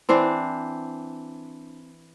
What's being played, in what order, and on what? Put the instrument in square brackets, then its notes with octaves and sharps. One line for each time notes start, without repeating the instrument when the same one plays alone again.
[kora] E3 C4 D4 C5